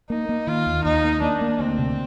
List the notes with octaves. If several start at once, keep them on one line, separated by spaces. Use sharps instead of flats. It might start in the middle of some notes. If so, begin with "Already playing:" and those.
A#3 D#4
A#3
D#3 F4
D#2
D#2 D#4
A#3
A#3 D4
A#3
D2 C4
C3